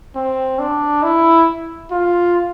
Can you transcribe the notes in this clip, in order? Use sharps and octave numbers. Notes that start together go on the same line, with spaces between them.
C4
D4
E4
F4